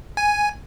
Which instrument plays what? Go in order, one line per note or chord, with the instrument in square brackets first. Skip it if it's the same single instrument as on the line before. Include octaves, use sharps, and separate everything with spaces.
[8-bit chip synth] G#5